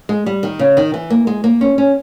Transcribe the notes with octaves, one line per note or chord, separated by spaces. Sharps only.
G#3
G3
D#3
C#3
D#3
E3
A#3
G#3
A#3
C#4
C#4